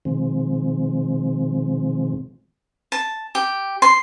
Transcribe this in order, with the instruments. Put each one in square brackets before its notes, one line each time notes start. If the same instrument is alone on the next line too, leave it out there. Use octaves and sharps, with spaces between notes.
[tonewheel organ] B2 D#3 F3 G#3 C4
[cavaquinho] A5
G4
C6